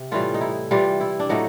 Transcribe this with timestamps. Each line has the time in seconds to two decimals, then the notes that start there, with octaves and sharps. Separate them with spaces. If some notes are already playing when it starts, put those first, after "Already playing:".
Already playing: C3
0.12 A2 E3 G3 F4
0.34 D#4
0.41 E4
0.71 C3 E3 G3 F4
1.01 E4
1.19 D4
1.29 A2 F#3 A3 D#4